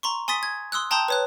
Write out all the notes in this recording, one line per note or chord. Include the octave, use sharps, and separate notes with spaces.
A#5 C6 C#6
G#5 C6 D#6 A6 B6
G#6
C6 D#6 E6 F#6
G5 A5 A#5 C6 D#6 G6
B4 C#5 F#6